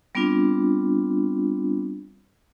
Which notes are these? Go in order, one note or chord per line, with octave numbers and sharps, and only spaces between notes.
G3 B3 C4 D4 F4